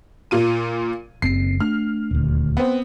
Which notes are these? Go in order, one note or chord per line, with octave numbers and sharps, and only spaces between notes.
A#2 F4 D#7
F#1 C4 C7
A3 D4 F6
D#1 D2
B3 C4